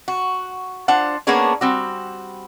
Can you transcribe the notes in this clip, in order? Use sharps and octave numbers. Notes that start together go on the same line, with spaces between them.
F#4
D4 F4 C5 F#5
A#3 B3 C#4 D4 G#4 C#5
G3 C4 F#4